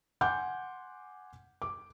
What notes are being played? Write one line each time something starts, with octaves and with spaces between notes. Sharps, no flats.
F#5 G#5 C6 D6 G6
D6